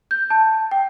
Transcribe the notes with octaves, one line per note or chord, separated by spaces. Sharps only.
G6
A5
G5